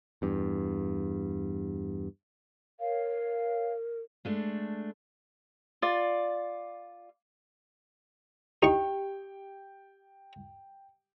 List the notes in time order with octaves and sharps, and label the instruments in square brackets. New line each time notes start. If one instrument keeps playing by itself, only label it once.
[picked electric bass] E2 G2
[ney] A#4 [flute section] C#5 F5
[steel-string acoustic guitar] G#3 A3 D4
[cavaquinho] F4 D5
[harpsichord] D#4 C#6 [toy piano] G4 [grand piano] G5